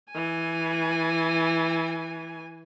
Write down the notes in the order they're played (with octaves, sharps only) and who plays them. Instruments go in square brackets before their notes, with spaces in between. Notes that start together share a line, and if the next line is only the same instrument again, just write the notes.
[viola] E3 G#5